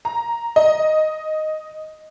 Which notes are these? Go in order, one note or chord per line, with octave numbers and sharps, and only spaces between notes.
A#5
D#5